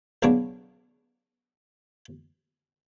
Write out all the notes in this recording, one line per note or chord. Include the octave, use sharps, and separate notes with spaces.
B1 C#3 B3 D4 C#5